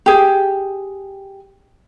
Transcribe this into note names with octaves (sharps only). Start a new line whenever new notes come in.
G4 G#4